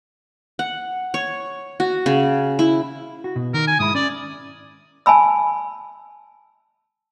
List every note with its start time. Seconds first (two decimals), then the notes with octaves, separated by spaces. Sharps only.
0.59 F#5
1.14 C#5
1.80 F#4
2.06 C#3
2.59 E4
3.24 F#4
3.36 B2
3.54 D#3 A#4
3.67 G#5
3.79 G#2 E4 B5 D#6
3.95 C#4 D5
5.06 G#5 A5 B5 E6